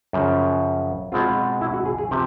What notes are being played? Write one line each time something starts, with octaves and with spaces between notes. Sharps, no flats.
F#2 C#3 F3
B2 G#3 C4 F4
E4
F#4
G#4
G#4
C3 F3 G4